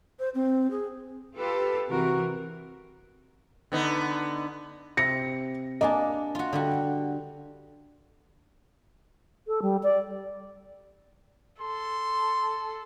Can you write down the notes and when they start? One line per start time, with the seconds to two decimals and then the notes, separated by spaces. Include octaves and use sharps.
0.19 C5
0.34 C4
0.70 G#4
1.37 F4 G4 A4 B4
1.89 C3 E3 F#4 A#4
3.72 D3 B3 D#4
4.97 C3 A#6 C#7
5.81 A#3 D4 D#5 G#5 A5
6.35 F4 F#4
6.53 D3 G3 F#4
9.47 A4
9.62 G3
9.83 D5
11.61 A4 C6